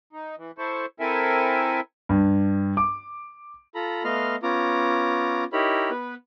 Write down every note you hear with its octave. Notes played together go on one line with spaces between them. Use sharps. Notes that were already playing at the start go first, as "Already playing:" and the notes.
D#4
E3
E4 A4 C5 C#6
C4 E4 A4 A#4 E5 G#5
G2
D6
F4 A4 A#5 B5
A3 B3 D#5 F5 C6 F6
B3 C#4 F4 A#5 D6
D#4 E4 G4 A#4 C#5 B5
B3 B4